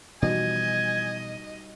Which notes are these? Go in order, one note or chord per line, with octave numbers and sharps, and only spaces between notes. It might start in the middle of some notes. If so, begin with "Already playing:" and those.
B2 E3 F3 G3 D#4 F#4 D#5 G#5